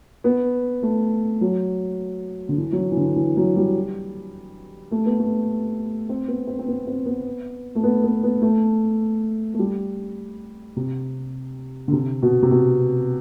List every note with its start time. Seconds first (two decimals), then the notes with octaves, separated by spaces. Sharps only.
0.24 B3
0.83 A3
1.41 F#3
2.49 D3
2.58 E3
2.72 F#3
2.78 E3
2.92 E3
2.97 D3
3.16 E3
3.37 F#3
3.56 G3
4.91 A3
5.06 B3
5.19 A3
6.09 C4
6.28 B3
6.47 C4
6.59 C4
6.68 B3
6.87 C4
7.06 B3
7.75 A3
7.83 B3
8.04 B3
8.23 B3
8.42 A3
9.54 A3
9.59 G3
10.76 C3
11.88 D3
11.93 C3
12.22 B2
12.42 C3
12.51 B2